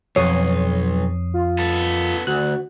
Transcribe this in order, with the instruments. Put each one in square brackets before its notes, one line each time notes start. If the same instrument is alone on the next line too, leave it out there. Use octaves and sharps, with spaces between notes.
[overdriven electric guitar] B1 [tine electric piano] F2 D#6 C7 [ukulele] C#5
[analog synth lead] F4
[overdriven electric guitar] B3 A4
[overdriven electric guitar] D2 [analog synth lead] F#4 [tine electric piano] F#6